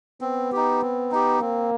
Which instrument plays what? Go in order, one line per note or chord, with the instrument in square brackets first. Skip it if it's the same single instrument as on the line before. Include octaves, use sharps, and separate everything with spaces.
[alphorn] B3 [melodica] C4
[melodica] D#4 G4
C4
D#4 G4
[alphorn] A#3 [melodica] C4